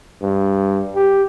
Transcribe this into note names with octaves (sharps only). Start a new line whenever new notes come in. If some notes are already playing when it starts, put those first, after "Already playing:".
G2
G4